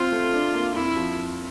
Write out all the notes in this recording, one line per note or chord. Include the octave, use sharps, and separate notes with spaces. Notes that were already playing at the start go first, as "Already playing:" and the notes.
Already playing: C4 F4
A3
D4
A#3
F2 E4
F3